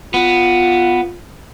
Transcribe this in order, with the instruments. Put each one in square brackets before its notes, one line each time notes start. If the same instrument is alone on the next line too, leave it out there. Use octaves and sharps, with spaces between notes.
[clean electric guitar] B3 [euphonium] F4